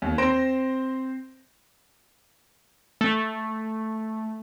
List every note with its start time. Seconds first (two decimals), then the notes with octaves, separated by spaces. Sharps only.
0.02 D#2
0.18 C4 C5 C6 A#6 D7 E7
3.01 A3